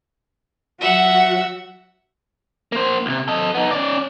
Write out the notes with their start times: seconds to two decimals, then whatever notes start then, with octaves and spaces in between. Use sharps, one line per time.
0.81 F#3 F#4 E5 F#5
2.72 A#3 C5
3.06 C2 C3
3.28 A4 D#5
3.55 B3 D#4
3.71 C#4 D5